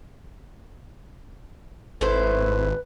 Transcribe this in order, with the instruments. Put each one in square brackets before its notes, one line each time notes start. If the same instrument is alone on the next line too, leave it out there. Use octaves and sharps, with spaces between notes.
[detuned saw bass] G#1 [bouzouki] A3 E4 C5 [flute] B4